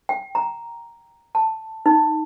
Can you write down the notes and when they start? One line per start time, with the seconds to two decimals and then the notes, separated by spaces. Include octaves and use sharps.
0.09 G5
0.35 A#5
1.35 A5
1.86 D#4